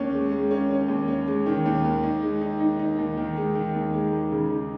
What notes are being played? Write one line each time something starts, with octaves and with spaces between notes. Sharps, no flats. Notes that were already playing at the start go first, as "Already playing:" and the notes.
Already playing: D#2 C#4
G#3
G#3
C#4
C#4
D#2
C#4
G#3
D#3
D#2
D#2
D#4
G#3
D#4
D#4
D#4
D#2
D#3
G#3
D#3
D#2
G#3
D#2
C#3
D#4